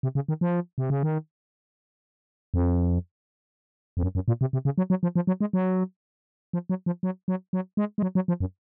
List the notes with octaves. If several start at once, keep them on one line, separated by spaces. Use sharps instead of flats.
C3
C#3
D#3
F3
C3
C#3
D#3
F2
F2
F#2
F#2
A#2
C3
C3
C#3
F#3
F#3
F3
F3
F#3
G#3
F#3
F3
F#3
F3
F#3
F#3
F#3
G#3
G#3
F#3
F#3
F3
F#2